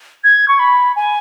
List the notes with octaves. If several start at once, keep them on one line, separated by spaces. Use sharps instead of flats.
G#6
C#6
B5
G#5